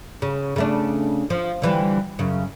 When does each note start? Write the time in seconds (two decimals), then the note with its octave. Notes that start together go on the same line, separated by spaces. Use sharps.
0.22 C#3
0.56 C#3 A3 D4
1.30 F3
1.62 D3 E3 G3
2.19 F#2 C#3